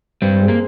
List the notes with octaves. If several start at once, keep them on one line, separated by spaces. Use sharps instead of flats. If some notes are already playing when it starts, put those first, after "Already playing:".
G2 G3 C4
G#3
A#3